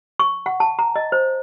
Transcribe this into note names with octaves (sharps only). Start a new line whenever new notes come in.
C#6
F#5
A5
A#5
D#5
C5